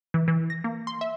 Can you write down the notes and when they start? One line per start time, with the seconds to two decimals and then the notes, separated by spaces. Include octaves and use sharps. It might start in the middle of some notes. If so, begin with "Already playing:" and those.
0.14 E3
0.28 E3
0.50 A#6
0.64 A#3
0.87 C6
1.01 E5